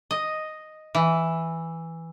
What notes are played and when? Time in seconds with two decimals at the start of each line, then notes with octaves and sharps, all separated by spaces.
0.11 D#5
0.95 E3